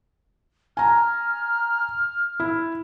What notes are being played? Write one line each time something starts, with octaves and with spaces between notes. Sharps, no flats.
G#5 A#5 F6
E4